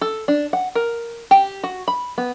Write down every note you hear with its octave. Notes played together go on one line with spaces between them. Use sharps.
A4
D4
F#5
A#4
G4
F#4
B5
B3